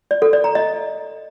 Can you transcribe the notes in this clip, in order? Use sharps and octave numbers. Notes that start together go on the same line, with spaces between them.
D5
A4
D5
A#5
D#5